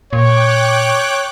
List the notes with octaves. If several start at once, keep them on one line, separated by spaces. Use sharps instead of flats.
A#2 C#5 G5 D6 F#6